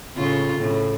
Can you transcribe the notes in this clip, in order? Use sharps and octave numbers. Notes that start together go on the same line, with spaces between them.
A2 C#3 F4
A2 C#3